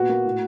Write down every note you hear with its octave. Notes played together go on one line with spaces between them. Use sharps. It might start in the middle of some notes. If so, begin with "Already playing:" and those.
Already playing: A#2 B3 F#4
A#3
A2